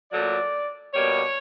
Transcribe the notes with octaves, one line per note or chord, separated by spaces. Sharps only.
A#2 F#3 A3 D5
B2 G3 A#3 C#5